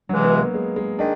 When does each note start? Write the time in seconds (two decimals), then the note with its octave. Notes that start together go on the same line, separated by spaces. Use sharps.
0.09 C#2 C3 E3 F#3 G#3
0.24 B3
0.39 A#3
0.54 G#3
0.76 G#3
0.99 D#3 G#3 D4